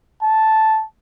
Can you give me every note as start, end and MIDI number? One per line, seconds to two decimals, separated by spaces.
0.22 0.85 81